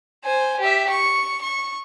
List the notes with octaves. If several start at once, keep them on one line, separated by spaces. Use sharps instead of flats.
C5 G#5
G4 E5
C#6
C#6